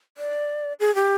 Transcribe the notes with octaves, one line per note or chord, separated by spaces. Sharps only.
D5
G#4
G4